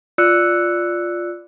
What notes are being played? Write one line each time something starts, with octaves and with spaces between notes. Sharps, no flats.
F4 D5 E6 F#6 C#7